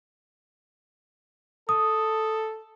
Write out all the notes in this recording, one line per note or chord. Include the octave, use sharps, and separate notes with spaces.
A4 D#6